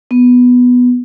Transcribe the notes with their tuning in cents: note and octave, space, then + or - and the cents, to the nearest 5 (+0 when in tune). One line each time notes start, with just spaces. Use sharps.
B3 +0